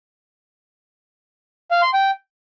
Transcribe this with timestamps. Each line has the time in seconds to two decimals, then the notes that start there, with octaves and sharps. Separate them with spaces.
1.71 F5
1.82 C6
1.93 G5